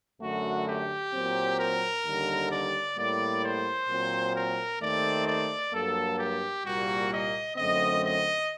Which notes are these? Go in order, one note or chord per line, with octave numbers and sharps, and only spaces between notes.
F#2 D3 A3 F#4
G4
A#2 F#3 C4
A#4
D#2 D3 G3
D5
A2 G3 A#3 D5
C5
A#2 F#3 C4
A#4
D#2 D#3 A3 C4 D5
D5
G2 F#3 A#3 A4
G4
C2 A#2 G3 A#3 F#4
D#5
F#2 D3 A3 C4 D#5
D#5